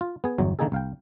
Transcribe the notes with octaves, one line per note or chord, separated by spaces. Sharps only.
F4
B3 G#4
G1 E2 F#3
D3 D#3 A#3 D#4 G#4 A4
C2 F5 G5